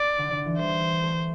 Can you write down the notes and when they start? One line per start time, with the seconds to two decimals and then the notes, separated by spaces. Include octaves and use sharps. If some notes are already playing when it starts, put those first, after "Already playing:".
Already playing: D5
0.18 D3
0.32 D3
0.46 E3
0.59 G3 C5
1.02 A3